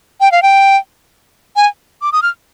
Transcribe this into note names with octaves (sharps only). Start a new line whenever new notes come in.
G5
F5
G5
G#5
D6
D#6
F6